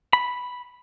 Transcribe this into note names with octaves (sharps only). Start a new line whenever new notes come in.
B5